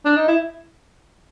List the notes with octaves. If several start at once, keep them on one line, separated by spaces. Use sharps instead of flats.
D4
D#4
E4